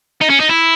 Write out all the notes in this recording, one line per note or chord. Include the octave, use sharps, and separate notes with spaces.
D#4
C#4
D#4
E4